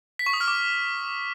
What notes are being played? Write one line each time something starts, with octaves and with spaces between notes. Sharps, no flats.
B6
C#6
D#6
F6
D6